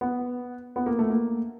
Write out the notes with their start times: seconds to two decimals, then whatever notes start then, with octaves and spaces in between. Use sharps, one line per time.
0.01 B3
0.76 B3
0.86 A#3
0.99 A3
1.10 A#3